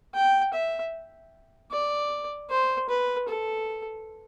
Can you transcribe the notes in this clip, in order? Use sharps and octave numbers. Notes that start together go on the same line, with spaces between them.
G5
E5
D5
C5
B4
A4